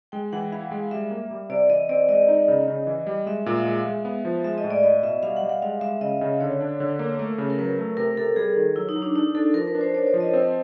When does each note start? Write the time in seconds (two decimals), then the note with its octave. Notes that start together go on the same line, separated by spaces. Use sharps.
0.12 G#3 G5
0.33 E3 F#5
0.52 E4 F5
0.71 G#3
0.91 G3 E5
1.11 A#3
1.31 G3
1.49 C3 D5
1.70 E3 D#5
1.89 C4 D5
2.09 G#3 D#5
2.28 D#4
2.48 C#3
2.68 C#3
2.87 E3
3.07 G3
3.26 G#3 E5
3.46 A#2 F5
3.56 E5
3.65 G#3
3.85 G#3
4.05 B3
4.25 F3
4.44 G#3 E5
4.58 D#5
4.64 A2
4.70 D5
4.83 E4 D#5
5.03 B2 E5
5.23 G3 F5
5.37 F#5
5.42 G3
5.49 F#5
5.62 G#3 F5
5.81 G#3 E5
6.01 C#3 D#5
6.21 C#3
6.41 D3 C#5
6.60 D4
6.80 D3
6.99 A#3
7.19 A3
7.38 C#3
7.50 A#4
7.59 F#3 B4
7.78 A3
7.97 C3 A#4
8.17 C3 A4
8.36 G3 G#4
8.56 D#3
8.76 F#3 E4
8.89 D#4
8.96 F#3
9.02 D4
9.16 D4 D#4
9.35 D4 A4
9.54 F3 A#4
9.67 B4
9.75 D4
9.81 C5
9.94 D4 C#5
10.07 C#5
10.14 F3
10.20 D#5
10.34 C4